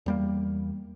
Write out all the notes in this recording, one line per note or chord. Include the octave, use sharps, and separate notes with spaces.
E2 G3 A#3